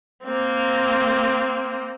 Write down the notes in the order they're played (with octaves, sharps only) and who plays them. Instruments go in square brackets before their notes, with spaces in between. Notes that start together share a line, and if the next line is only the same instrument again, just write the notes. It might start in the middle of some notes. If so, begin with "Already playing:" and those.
[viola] A#3 C4